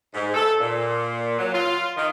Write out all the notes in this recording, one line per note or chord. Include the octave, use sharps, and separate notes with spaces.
G#2
A4
A#2
F#3
F4
D#3